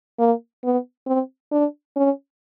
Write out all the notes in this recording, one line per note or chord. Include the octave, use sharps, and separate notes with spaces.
A#3
B3
C4
D4
C#4